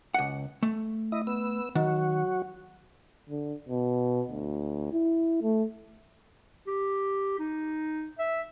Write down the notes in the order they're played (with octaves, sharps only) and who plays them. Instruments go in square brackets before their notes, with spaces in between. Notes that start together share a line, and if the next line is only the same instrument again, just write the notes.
[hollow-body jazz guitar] C#2 F#5
A3
[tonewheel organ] E4 D#5
B3 E6
[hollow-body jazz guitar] D#3 [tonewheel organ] F#3 F#4
[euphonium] D3
B2
D2
E4
A3
[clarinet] G4
D#4
E5